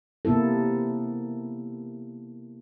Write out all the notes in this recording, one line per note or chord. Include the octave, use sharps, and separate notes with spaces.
C3 A#3 B3 E4 A4